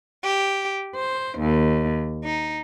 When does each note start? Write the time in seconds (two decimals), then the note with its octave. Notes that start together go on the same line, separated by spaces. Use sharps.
0.22 G4
0.94 C5
1.39 D#2
2.23 D#4